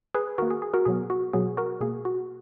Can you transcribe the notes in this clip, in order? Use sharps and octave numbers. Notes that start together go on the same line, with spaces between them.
G#4 B4
D#3 A#3 F#4 A#4
G#4
G#4
F#4 A#4
B2 F#3 B3 G#4
F#4
B2 F#3 B3 G#4
F#4 A#4
B2 A#3 G#4
F#4